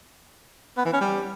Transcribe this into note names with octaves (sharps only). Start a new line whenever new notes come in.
B3
E3
C#4
G3